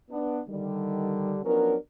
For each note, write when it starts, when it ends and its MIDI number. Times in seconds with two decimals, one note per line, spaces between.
0.11 0.41 59
0.11 0.41 62
0.48 1.39 50
0.48 1.39 51
0.48 1.39 55
1.44 1.75 53
1.44 1.75 54
1.44 1.75 59
1.44 1.75 61
1.44 1.75 62
1.44 1.75 70